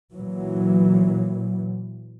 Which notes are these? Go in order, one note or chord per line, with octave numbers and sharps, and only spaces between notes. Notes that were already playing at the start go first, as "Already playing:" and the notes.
A#2 E3 F#3